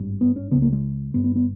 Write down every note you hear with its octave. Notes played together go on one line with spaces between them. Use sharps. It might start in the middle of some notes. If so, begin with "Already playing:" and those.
Already playing: G#1 G2
B3
C#4
C#2 C#3 B3
A#3
G#3
G1 G2 B3
B3
B3